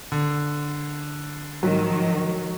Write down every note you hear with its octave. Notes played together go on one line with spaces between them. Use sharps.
D3
G#2 D#3 F3 F#3